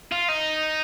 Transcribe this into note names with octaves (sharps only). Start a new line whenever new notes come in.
F4
D#4